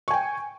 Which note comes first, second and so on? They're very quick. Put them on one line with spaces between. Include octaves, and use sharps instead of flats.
C#6 G#5 G5